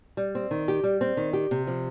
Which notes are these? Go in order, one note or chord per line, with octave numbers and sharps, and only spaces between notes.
G3
C4
D#3
G4
G3
C4
D#3
G4
C3
F3